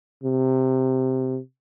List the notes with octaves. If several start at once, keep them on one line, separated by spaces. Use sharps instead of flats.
C3